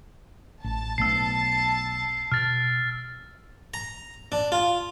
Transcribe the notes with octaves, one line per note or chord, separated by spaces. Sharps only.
A1 A5
B1 A3 B3 E6 C7
B2 F6 A6
A#5
D4
F4